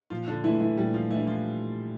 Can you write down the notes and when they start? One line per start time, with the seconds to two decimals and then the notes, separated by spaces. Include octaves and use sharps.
0.10 A#2 F3 F4
0.27 D3 D4
0.44 E3 A3 D4 E4
0.60 E3 E4
0.77 A#2 G3 G4
0.94 F3 F4
1.10 E3 A3 D4 E4
1.27 F3 F4